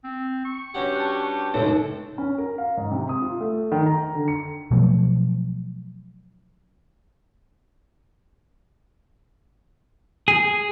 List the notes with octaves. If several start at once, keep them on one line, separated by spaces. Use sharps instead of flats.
C4
C#6
G2 C#4 F#4 G4 F#5
A5 F#6
C#2 F#2 A2 D4 D#4
C#4
A#4
F5
G#2
C3
D#6
F4
A3
D#3
A#5
D3
C#7
B2 F3 F#3 A3
G#4